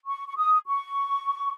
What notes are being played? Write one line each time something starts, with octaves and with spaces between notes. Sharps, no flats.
C#6
C#6
D#6
C#6